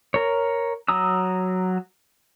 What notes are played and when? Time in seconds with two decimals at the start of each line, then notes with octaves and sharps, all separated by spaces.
0.14 A#4 C#5
0.88 F#3 A#5 D#6 E6